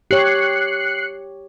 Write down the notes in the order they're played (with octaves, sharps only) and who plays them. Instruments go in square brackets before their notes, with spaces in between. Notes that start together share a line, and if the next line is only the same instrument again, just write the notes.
[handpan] G4 C#5 [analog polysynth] F#6 C7 C#7